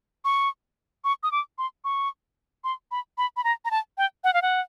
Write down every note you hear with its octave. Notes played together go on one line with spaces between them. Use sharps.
C#6
C#6
D#6
D6
C6
C#6
C6
B5
B5
B5
A#5
A#5
A5
G5
F#5
F5
F#5